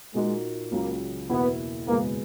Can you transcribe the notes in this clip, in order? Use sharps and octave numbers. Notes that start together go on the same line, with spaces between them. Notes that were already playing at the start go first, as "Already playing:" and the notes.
A#2 G#3 A#3 D#4 F#4
C#2 C#3 F#3 A#3
E2 B2 A#3 B3 E4
F#1 E2 B2 G#3 A#3 B3